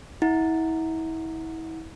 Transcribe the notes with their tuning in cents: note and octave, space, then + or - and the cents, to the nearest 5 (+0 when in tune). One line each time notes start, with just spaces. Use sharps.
E4 -35 F#5 -20